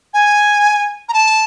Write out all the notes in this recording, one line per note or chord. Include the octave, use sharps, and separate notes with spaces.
G#5
A#5
A5